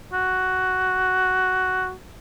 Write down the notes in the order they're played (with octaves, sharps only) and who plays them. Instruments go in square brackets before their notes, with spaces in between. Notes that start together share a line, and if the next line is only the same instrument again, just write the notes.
[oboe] F#4